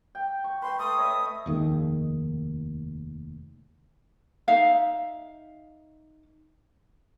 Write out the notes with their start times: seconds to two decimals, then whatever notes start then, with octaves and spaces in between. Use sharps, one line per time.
0.15 G5
0.44 C#6
0.62 B4 G5 C6
0.79 A3 D#6
0.98 C#5 D#5 E5
1.46 F1 D#2 D#3 G#3
4.48 D#4 E5 F5